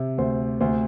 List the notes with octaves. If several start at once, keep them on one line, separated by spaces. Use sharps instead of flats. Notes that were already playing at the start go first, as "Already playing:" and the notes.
Already playing: C3
D2 C5
D2 C5